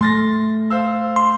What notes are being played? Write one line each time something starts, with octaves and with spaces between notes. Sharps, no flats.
A3 C6 A6 A#6
C5 F5 E6
C6